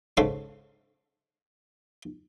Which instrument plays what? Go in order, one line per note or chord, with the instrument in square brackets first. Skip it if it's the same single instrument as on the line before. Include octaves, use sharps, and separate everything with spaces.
[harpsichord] G#2 C#3 A4 C6 C#6